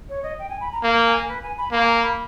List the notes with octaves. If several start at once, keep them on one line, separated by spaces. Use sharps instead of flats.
C#5
D#5
G5
G#5
B5
A#5
A#3 A#5
A#5
G#5
A#4
B4
G#5
B5
A#3 A#5
G#5
A#5
B5